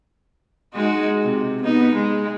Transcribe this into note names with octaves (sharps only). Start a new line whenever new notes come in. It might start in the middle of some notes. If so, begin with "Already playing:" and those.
G#3 D#4 F#4
C3
B3 D#4
G#3